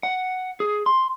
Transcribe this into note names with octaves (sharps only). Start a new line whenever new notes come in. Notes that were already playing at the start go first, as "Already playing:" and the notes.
F#5
G#4
C6